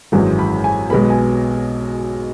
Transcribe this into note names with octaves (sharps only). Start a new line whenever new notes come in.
G#1 F#2 E3 G#3
B5
G#5
B1 B2 G#3 B3 B5
G#5